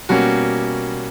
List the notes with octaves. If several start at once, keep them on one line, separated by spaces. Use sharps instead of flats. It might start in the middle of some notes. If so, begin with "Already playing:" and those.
B2 G3 A#3 C#4 F#4